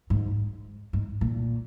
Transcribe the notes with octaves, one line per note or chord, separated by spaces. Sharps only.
G#2
G#2
A#2